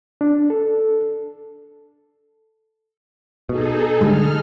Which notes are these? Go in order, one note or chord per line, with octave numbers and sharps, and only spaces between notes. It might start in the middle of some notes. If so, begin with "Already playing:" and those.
D4
A4
B2 D#4 G#4 A4
D3 G3 G#3 F6